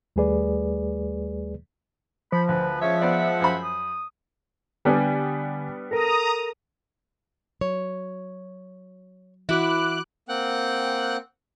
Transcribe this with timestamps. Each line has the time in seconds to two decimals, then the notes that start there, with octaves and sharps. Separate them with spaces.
0.16 D#2 G3 A3 G#4 B4 D5
2.32 F3 B5
2.48 D2 B4
2.82 G#3 C#4 F4 C#5 E5
3.01 B3 C5 D5 F#5
3.40 F#2 C5 B5
3.63 D#6
4.85 D3 G3 B3 D4 G#5
5.91 A4 A#4 A#5 D#6
7.61 F#3 C#5
9.49 E3 E4 F#4 D6 F#6
10.29 A#3 C4 F#5 G5 F#6